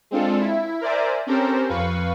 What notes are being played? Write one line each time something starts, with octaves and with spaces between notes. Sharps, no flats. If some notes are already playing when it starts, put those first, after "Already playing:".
G#3 C4 D4 F4 A4
E4
A#4 C5 D5 E5 G#5
C4 C#4 G4 A4 A#4 C5
F2 B4 F5 C#6